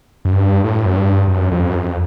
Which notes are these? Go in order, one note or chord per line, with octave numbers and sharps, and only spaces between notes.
F#2
G2
A2
F#2
G2
F#2
F2
F#2
F2